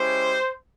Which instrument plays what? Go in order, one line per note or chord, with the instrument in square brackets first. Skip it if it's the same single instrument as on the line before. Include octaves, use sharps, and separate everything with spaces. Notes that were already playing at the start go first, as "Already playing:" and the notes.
Already playing: [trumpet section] G#3 C#4 E4 G4 C5